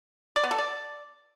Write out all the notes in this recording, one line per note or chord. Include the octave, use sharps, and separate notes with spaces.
D5
B3
A4
D5